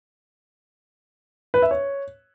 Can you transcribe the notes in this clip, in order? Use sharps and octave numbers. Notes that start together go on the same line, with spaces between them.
B4
E5
C#5